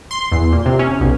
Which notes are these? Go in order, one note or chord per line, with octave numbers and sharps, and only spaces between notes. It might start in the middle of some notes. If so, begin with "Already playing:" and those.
C6
E2
A#2
C3
C#4
B1